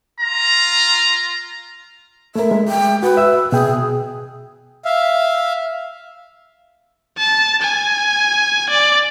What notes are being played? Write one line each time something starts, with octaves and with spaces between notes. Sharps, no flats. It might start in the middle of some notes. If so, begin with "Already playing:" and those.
F4 A#5
A3 A#4 E5
G#3
G5
F#4 B4
E5 E6
B2 G#4 G5
E5 F5
A5
G#5
D5